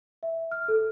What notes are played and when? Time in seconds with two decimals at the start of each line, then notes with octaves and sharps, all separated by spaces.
0.23 E5
0.51 F6
0.68 A4